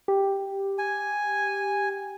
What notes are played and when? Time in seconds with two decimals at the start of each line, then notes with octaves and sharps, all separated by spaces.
0.08 G4
0.78 G#5